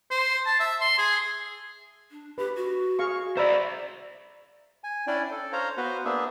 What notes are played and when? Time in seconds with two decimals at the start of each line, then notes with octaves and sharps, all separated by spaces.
0.11 C5
0.46 A5
0.60 E5
0.81 C6
0.98 G#4
2.11 D4
2.38 G4 B4
2.56 F#4
2.99 G#4 F5 C#6
3.37 C5 D5 E5 A#5 B5
4.84 G#5
5.07 C#4 D4 E4 D5 G5 G#5
5.31 A4
5.53 C5 C#5 F5 A#5
5.77 B3 F#4 B4 C5
6.05 A#3 B3 D4 G#4 E5